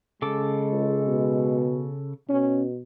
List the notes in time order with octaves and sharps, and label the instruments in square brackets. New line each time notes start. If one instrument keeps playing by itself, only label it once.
[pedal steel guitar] C#3 A4 D6 [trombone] G#3
[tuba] C#2
B2
[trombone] B2 [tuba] C#4